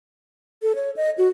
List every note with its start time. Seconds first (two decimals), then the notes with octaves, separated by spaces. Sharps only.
0.62 A4
0.75 C#5
0.96 D#5
1.18 F#4